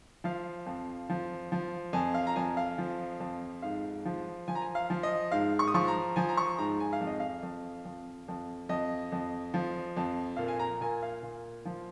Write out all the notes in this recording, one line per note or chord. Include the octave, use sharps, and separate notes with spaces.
F3 F5
F2
F3
F3
F2 G#5
F5
A#5
F2 G#5
F5
F3
F2
G#2 F5
F3
F3 G#5
A#5
G#5
F5
F3
D#5
G#2 F5
C#6
D#6
F3 C#6
A#5
F3 G#5
A#5
C#6
G#2 A#5
G#5
F5
F2
D#5
F5
F2
F2
F2
F2 D#5
F2
F3
F2
A#2 F5
G#5
A#5
A#2 G#5
F5
A#2
F3